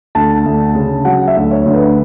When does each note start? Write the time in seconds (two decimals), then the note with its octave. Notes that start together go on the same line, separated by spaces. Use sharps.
0.15 D2 A5
0.46 D2
0.75 C#3
1.05 F#3 F#5
1.28 E5
1.36 D2
1.51 C#5
1.66 D2
1.74 B4